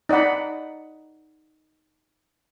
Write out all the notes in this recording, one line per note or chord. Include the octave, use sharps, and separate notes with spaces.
D#4 D5 D#5 F#5 B5